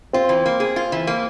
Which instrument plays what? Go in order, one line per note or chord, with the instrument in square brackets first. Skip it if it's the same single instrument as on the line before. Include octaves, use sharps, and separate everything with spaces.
[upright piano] C4 [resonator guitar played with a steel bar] F4
[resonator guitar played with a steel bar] E3
A#3
G#4
F4
E3
A#3